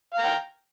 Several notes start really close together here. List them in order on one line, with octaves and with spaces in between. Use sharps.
F5 A#5 G5